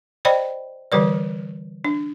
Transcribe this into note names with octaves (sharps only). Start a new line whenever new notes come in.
C5 D5 D#5 G5 B5
D3 E3 G3 B4 D5
D4